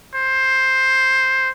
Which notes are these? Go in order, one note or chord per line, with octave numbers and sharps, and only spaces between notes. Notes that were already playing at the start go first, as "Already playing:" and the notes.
C5